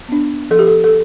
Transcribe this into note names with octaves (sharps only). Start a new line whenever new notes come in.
B3 D4
F3 A4
G4
A4
A4